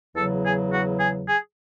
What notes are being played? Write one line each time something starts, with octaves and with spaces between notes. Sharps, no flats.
E2 C#3 F#3 A4
G#4
F#4
G#4
G#4